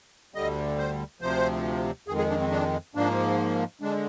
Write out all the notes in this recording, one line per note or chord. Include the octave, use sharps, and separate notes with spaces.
D2 D3 G3 D#5
C5
D2 C3 F3 C5
F2 D#3 G#3 G#4
G#4
D4
C4
D4
G#2 F3 A#3 D4
D3 G#3 D4